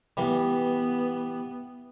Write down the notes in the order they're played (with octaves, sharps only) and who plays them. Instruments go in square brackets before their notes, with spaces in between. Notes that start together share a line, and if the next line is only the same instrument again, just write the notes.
[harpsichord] E3 G3 [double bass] B3